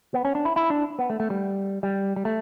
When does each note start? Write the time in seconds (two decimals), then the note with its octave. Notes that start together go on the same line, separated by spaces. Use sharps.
0.14 B3
0.25 C#4
0.35 D4
0.45 E4
0.56 E4
0.70 D4
0.99 B3
1.10 A3
1.20 A3
1.30 G3
1.83 G3
2.16 G3
2.25 A3